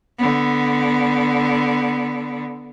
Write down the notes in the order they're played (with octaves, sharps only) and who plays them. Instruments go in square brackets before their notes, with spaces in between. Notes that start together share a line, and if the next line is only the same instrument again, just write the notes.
[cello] D3 B3